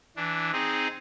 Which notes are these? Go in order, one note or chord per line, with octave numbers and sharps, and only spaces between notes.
E3 D4
C4 D#4 G#4